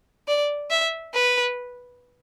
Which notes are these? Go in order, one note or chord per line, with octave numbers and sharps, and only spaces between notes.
D5
E5
B4